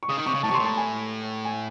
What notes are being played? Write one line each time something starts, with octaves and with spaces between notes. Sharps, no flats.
C#6
C#3 D#6
D#3
C3 C#6
C#3
A2 A5
C3 C#6
C6
A2
A5
G#5
G#5